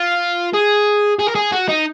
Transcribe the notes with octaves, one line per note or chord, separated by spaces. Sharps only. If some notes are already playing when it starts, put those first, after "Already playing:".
Already playing: F4
G#4
G#4
A#4
G#4
F#4
D#4